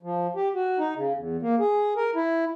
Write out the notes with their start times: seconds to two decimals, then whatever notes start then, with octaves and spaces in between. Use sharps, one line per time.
0.03 F3
0.35 G4
0.55 F#4
0.79 D#4
0.97 C#3
1.15 E2
1.42 A#3
1.59 G#4
1.96 A#4
2.15 E4